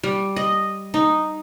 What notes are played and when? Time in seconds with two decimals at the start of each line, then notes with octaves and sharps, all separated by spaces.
0.03 G3
0.36 D#5
0.94 D#4